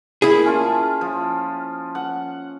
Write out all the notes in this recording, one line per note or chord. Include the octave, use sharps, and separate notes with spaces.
A#2 E4 G#4
C#4 F4 A5
F3
F#5